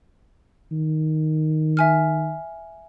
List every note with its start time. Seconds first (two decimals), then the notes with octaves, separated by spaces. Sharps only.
0.71 D#3
1.77 E5 G#5 F6